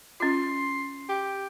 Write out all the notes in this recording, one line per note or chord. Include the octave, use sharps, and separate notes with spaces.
C#4 F4 C6
G4